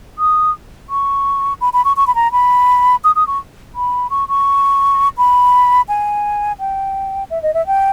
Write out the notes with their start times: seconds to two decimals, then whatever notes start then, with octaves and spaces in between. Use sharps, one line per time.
0.19 D#6
0.90 C#6
1.61 B5
1.73 B5
1.85 C#6
1.97 C#6
2.07 B5
2.15 A#5
2.32 B5
3.04 D#6
3.16 D#6
3.27 C#6
3.75 B5
4.10 C#6
4.29 C#6
5.17 B5
5.89 G#5
6.60 G5
7.30 E5
7.43 D#5
7.54 E5
7.67 G5